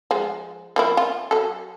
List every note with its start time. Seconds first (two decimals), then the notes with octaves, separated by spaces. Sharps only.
0.11 F3 G#3
0.76 F3 A#3 E4
0.97 F4
1.31 F#3 A4